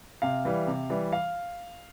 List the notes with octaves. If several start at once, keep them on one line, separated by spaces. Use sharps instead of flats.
C3 F5
E3 G3
C3
E3 G3
F5